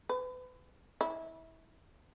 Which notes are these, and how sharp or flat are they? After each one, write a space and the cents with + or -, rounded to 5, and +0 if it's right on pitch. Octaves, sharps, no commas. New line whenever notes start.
B4 +35
E4 -25